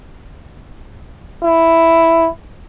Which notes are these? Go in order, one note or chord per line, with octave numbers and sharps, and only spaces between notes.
E4